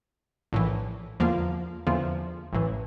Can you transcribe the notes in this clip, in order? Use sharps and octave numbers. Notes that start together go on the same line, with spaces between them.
A#1 A2 E3
E2 D3 F3 A#3 F4
E2 D3 F3 A#3 F4
A1 A2 E3